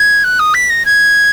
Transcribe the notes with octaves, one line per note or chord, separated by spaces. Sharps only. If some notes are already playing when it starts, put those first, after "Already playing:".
Already playing: G#6
F#6
D#6
B6
A#6
G#6